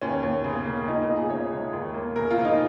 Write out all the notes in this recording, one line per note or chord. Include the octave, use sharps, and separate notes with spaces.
D#2 C#4
D#2
C#3
A#3
C#2 D#4
D#4
C#2
G#4
C#3 C#5
G#3
D#2
A#3
C#3 A#4
F4
F3
D#4